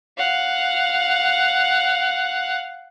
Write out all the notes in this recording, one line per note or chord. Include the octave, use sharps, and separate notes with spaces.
F5 F#5